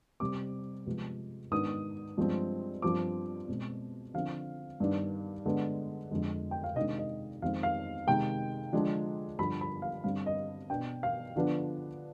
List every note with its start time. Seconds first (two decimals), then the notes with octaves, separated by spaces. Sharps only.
0.20 C3 G3 C4 D6
0.86 C3 F3 G#3 B3
1.51 G#2 D#3 B3 D4 D#6
2.17 G2 F3 G#3 C4
2.82 G2 F3 C4 D6
3.48 B2 G#3 C4
4.14 D3 F3 C4 F5
4.80 G2 D#3 B3 D4
5.46 D3 G#3 B3
6.11 F2 D3 G#3
6.51 G5
6.64 F5
6.76 C3 D#3 G#3 D4 D#5
6.98 D#5
7.42 F2 D#3 G#3 C4 F5
7.63 F5
8.07 C3 D#3 G#3 G5
8.73 D3 F3 G#3 D4
9.39 G2 D3 F3 B5
9.61 B5
9.82 F5
10.04 G2 D3 G3 C4 F5
10.26 D#5
10.70 B2 B3 D4 G5
11.03 F5
11.36 D3 F3 B3 D4